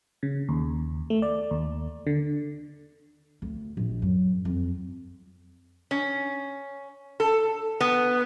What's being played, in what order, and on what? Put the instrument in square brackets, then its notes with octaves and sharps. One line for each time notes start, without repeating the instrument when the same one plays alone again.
[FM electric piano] C#3
D#2
A3
D5
D#2
D3
[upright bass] D2
A#1
F#2
F2
[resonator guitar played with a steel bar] C#4
A4
B3